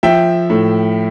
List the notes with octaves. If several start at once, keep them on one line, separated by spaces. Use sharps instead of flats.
F3 E5 G5
A2